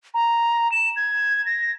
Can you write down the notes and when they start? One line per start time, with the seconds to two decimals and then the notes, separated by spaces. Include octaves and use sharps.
0.14 A#5
0.72 E7
0.96 G#6
1.46 A#6